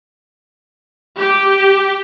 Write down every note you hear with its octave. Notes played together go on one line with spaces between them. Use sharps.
G4